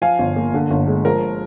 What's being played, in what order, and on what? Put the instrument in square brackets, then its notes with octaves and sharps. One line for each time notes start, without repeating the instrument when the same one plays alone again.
[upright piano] F3 F5 G#5
G1
A#3
D3
G1
G#3
F3 A#4